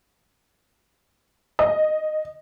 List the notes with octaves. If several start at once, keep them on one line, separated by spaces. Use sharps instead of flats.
D#5